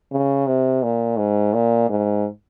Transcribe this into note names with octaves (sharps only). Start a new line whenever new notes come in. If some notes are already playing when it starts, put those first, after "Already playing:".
C#3
C3
A#2
G#2
A#2
G#2